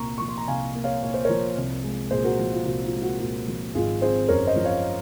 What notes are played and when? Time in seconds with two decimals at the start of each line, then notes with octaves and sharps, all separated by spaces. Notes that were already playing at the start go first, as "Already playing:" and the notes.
Already playing: C2 A#2 A#3 A#5 C#6
0.18 F3 C#6
0.28 C6
0.37 A#5
0.48 C2 F5 G#5
0.75 A#3
0.84 C#5 F5
1.03 A#2 C#5
1.14 C5
1.25 F3 A#4 C#5
1.57 C2
1.84 G#3
2.11 A#2 G#4 C5
2.24 F#4 A#4
2.39 F3
2.52 F4
2.65 C2 F#4
2.84 F4
2.93 G#3
3.02 F#4
3.20 A#2 F#4
3.48 F3
3.75 G#1 F4 G#4
4.01 C4 G#4 C5
4.29 F#2 A#4 C#5
4.47 C5 D#5
4.56 F3
4.65 C#5 F5